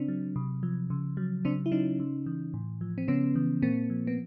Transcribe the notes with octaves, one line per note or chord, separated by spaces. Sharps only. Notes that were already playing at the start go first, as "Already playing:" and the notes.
Already playing: C#3 C4 D4
F#3
C3
F3
C#3
F#3
C#3 C4 D4
E4
F#3 C#4 D#4
C#3
E3
A2
F3
C4
C#3 B3 C#4
E3
A#2 A#3 C4
F3
B3